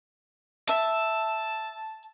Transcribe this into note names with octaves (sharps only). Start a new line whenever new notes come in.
E5 A5